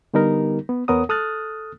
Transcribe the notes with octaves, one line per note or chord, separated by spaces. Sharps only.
D3 G3 B3 D#4 G4 A#4
B3
E2 B3 A#4 C#5 F#5 D#6
A4 D#6 F6 F#6 A6